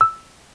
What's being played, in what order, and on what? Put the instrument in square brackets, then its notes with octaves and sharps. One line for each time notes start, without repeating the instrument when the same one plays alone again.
[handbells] E6